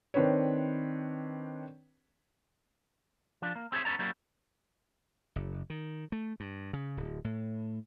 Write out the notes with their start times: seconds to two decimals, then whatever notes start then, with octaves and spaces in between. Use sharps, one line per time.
0.14 D#3 C4 D4 B4 C#5
3.42 F3 D4
3.55 A#3
3.72 C4 G4 G#4 C5 C#5 E5
3.85 B3 C#4 A4 D5 A#5
3.99 F#3 G3 A#3 C#4 E4
5.36 F#1
5.70 D#3
6.12 A3
6.40 G2
6.73 C#3
6.97 D1
7.24 A2